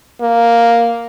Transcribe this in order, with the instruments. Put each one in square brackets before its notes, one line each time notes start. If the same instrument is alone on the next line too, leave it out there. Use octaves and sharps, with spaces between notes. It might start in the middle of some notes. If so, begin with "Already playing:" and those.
[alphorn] A#3